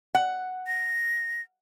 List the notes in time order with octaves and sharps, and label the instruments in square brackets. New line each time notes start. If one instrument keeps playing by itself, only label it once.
[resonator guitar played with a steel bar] F#5
[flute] A#6